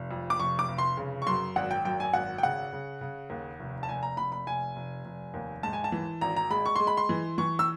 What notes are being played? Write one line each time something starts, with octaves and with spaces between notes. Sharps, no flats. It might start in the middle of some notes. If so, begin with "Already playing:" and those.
Already playing: F1
F2
D6
F1 C#6
D6
F1
C6
C#3
C#6
F#2 C6
G#1 F#5
G5
F#2 G5
G#5
G#1 F#5
G5
C#3 F#5
C#3
C#3
D#2
F1
A5
F1 G#5
A#5
F1 B5
B5
F1 G#5
F1
F1
D#2
G#2 A5
G#5
A5
E3
G#1 A#5
A#5
G#3 B5
C#6
G#3 C6
B5
C6
E3
E3 C#6
E6